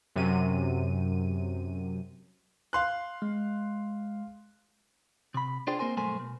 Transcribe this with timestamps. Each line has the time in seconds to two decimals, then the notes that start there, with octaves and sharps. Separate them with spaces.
0.16 F#2 C3 D#7
2.73 F5 C6 F#6
3.22 G#3
5.34 C3 B5
5.67 D4 F4 G#4 C5 D5 G5
5.79 A#3 C4 A#4 C5 G#5
5.97 B1 G2 A3 A#4 C5 G#5
6.19 B2